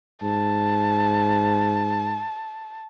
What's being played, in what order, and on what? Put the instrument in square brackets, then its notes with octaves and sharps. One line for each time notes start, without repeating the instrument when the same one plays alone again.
[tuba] G#2 [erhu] A5